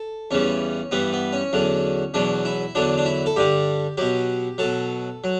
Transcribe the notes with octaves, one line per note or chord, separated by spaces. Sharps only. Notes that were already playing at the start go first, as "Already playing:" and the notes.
Already playing: A4
E2 C#3 E3 G3 C#4
G2 E3 G3 B3
B3
C#4
E2 D3 F#3
E2 B2 F#3 D4
E4
E2 D3 F#3 D4
D4
E4
A4
G2 D3 G3 G4
B2 F#3 G4
B2 F#3 A4
F#3